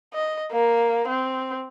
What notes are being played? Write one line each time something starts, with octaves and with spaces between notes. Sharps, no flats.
D#5
A#3
C4